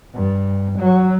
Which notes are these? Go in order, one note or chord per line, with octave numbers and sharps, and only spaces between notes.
G2
F#3